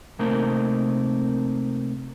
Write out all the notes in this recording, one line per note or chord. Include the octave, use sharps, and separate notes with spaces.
C3 A3 A#3 C4 D#4 A#4